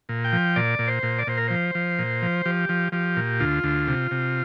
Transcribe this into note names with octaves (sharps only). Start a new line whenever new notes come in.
A#2
G5
F3
A#2 D5
A#2
C5
A#2
D5
A#2 C5
A#4
F3 C5
F3
A#2
F3
F3 G4
F3
F3 G4
A#2
D2 F4
D2
C3
C3